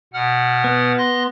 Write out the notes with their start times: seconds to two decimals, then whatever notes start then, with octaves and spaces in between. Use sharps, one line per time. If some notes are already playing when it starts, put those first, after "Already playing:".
0.14 B2 F#5 F6
0.64 B3
0.98 C6 F#6 A#6